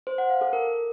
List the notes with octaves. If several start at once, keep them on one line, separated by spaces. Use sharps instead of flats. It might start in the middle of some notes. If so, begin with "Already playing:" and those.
C5
F#5
F5
A4
A#4